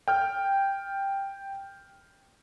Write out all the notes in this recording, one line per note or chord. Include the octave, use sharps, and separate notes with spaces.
G5 F6 G6